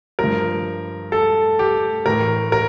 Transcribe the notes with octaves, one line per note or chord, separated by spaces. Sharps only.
G2 F3 A#4
A4
G4
A2 E3 A#4
A#4